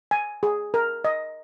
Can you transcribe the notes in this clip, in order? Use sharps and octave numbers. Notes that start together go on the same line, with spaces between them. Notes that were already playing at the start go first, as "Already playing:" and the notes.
G#5
G#4
A#4
D#5